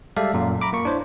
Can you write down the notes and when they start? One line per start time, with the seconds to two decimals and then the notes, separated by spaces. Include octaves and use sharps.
0.17 G3 G#3 A4 D5 E5 F5
0.34 F#2 A#2
0.61 A#5 B5 D6
0.73 A#3 C#6
0.85 D4 E4 C5 C#5